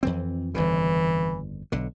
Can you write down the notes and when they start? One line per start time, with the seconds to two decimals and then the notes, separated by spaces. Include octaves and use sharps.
0.03 F2 E3 C4
0.54 G1 F2 C#3 E3
1.72 B1 D3